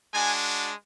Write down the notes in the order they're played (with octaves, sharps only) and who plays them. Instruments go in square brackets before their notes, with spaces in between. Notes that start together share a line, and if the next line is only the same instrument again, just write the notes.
[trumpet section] G#3 D4 F#4 G#5